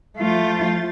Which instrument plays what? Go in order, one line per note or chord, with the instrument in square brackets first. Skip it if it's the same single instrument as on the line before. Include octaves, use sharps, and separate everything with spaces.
[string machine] F3 G6 A6 [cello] A3 F4